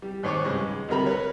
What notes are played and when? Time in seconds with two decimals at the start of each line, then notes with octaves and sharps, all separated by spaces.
0.02 G3
0.23 D#2 G#2 C#5 C#6 D6
0.44 C#2 G2 G#3
0.89 D2 C3 G3 A#4 A#5 B5
1.06 A#4 B4 C#5